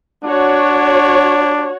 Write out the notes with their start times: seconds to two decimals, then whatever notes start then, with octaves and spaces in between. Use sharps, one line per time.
0.24 D4 F#4 C#5